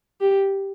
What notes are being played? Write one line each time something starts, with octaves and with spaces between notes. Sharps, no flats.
G4